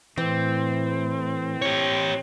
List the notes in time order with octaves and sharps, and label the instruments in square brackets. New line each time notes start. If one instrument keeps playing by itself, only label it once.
[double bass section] A2 [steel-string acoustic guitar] E3 [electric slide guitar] C4
[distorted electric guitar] G4 C#5